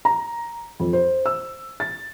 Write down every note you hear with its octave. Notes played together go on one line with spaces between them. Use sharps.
A#5
F2
C5
E6
A6